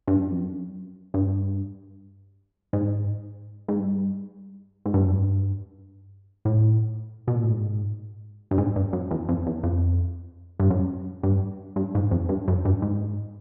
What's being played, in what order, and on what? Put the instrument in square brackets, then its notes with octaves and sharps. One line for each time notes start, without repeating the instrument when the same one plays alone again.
[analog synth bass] G2
F#2
F2
F#2
G2
G#2
G#2
G2
G#2
G2
F#2
G2
A2
B2
A#2
A2
G#2
G2
G#2
G2
F#2
E2
F2
E2
F2
G2
F#2
G2
G2
G#2
F2
G2
F#2
G2
G#2